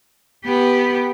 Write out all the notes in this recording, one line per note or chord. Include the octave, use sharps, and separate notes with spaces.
B3 G4